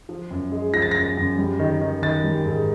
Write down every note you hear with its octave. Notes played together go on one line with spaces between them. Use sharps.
F3
F#2
G#3
F3 A#6
A6
F#2 A#6
F#2
G3
D#3
D#3
D#3 A6
G3
G#2